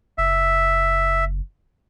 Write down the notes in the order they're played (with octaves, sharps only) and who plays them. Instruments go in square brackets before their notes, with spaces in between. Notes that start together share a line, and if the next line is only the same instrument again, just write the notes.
[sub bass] F#1 [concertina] E5